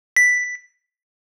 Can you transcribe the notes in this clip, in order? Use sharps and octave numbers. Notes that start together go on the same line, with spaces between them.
B6